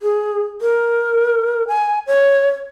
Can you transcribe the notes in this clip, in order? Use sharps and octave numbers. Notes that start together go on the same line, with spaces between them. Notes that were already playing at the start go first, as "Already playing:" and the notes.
G#4
A#4
G#5
C#5